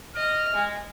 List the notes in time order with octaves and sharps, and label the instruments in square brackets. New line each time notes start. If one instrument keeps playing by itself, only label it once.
[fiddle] D#5 [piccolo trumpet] F6
[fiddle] G#3